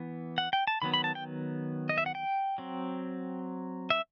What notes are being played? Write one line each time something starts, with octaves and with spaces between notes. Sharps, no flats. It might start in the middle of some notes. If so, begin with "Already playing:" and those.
Already playing: E3 B3
F#5
G5
A5
D#3 F#3 B3 B5
B5
A5
G5
D#5
E5
F#5
G5
F#3 C4
E5